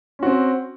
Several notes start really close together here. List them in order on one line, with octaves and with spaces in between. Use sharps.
C#4 F#4 C4